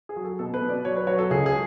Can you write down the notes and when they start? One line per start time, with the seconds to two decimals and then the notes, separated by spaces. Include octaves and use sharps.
0.09 G#4
0.16 F#3
0.24 A4
0.39 B2 A4
0.54 B4
0.62 B2
0.69 D5
0.85 F#3 C#5
0.97 B4
1.07 F#3 C#5
1.19 A4
1.30 C#2 G#4
1.46 G#4